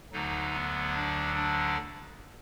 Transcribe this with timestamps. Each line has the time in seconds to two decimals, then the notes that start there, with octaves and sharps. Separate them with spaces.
0.12 D2 D3 F#3 D#4
0.53 B3
0.94 D4
1.35 D4